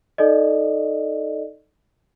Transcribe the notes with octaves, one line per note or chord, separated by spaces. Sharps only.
D#4 A4 D5 D#5